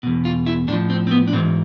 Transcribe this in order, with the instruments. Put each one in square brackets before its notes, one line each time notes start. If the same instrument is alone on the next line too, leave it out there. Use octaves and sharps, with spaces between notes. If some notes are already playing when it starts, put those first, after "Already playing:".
[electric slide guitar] E2 B2
F4
E4
A2 D4
F3
C4
C4
B3
D4
G#2 E3 C4